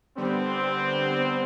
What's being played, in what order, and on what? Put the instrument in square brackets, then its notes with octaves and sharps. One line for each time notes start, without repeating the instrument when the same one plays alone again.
[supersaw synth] D3 G3 B3 [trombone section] C4